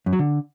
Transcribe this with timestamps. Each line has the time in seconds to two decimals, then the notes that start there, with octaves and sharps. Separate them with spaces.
0.06 F#2
0.13 F#3
0.19 D3